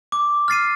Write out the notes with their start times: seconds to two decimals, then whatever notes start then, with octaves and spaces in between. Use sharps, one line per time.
0.12 D6
0.48 F6 A6 C7 D#7